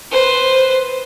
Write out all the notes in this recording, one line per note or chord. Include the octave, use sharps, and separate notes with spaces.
B4 C5